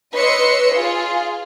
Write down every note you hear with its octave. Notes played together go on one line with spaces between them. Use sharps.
B4 C#5 D#5 C6 E6 C#7
F4 G#4